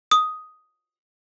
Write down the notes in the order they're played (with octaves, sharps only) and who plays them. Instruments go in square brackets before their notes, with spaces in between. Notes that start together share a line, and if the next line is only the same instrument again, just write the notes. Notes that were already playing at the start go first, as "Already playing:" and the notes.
[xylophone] D#6